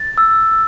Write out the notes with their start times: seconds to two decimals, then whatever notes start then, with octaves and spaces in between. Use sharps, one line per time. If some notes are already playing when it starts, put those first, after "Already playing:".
Already playing: A6
0.18 E6